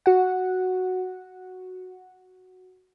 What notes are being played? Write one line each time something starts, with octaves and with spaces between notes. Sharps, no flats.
F#4 F#5